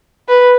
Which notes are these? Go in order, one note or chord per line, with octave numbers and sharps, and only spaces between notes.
B4